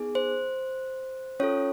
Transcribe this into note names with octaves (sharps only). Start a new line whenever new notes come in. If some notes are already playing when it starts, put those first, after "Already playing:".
Already playing: B3 D#4 G#4
C5
C#4 F4 A4 C#5